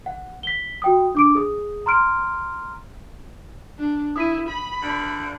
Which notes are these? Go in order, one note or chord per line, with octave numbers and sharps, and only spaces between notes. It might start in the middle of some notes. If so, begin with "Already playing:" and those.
F#5
B6 G7
F#4 G5 D#6
D4 D6 D7
G#4 D#6
A#5 C6 F6 D7
D4
E4 D#6 B6 D#7
B5
D3